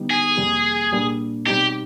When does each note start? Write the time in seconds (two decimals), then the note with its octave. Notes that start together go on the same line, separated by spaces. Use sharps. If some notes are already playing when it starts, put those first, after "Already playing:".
Already playing: D3 G3 B3 D#4 G4
0.11 G#4
0.37 F2 C3 D#3 G3 A#3
0.92 C2 A#2 G3 A#3 D4
1.47 B2 G3 C4 D#4 G4